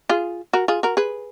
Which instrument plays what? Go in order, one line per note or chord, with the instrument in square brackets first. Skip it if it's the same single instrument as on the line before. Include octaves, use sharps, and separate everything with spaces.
[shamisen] F4 G#4
F#4 A#4
F4 G#4
F#4 A#4
G#4 B4